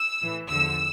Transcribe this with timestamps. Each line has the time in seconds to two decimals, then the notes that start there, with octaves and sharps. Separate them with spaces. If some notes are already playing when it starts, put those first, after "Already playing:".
Already playing: E6
0.21 A2 E3
0.49 E2 D3 F3 E6